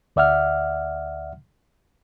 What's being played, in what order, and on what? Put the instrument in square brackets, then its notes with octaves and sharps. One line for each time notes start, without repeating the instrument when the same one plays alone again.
[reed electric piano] D2 D5 E5 F#5 F6